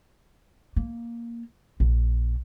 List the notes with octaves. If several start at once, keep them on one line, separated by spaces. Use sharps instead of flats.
A#3
A#1